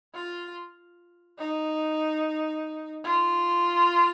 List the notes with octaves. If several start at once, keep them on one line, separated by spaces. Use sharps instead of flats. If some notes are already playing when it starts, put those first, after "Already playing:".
F4
D#4
F4